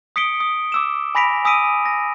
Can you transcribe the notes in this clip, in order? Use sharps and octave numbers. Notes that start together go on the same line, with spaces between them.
D#6 B6 C#7 D7 G7
D#6
D6 E6 E7
G#5 B5 A#6 B6 D7 F7
G#5 D#6 E6 B6 D7 D#7
A#6